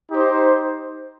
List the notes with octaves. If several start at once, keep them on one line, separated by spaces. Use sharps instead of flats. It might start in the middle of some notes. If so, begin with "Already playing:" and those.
D#4 G4 C5